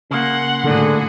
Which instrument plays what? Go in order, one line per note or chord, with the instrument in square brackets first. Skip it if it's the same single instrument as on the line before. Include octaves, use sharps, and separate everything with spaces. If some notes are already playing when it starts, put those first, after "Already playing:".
[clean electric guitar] C#3 A#3 [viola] F#5 C6
[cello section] A2 F#4 G#4 [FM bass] D3